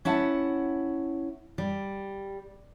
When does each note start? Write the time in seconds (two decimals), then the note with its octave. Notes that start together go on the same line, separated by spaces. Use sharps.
0.05 C#4 E4 F#5 A5
1.58 G3